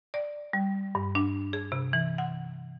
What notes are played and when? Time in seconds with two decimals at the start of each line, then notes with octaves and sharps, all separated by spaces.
0.14 D5
0.53 G3
0.95 G2
1.15 D4
1.53 G#4
1.72 C3
1.93 E3
2.18 F#5